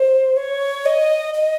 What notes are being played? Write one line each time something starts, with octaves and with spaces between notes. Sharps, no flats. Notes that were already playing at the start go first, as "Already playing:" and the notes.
Already playing: C5
C#5
D#5
D#5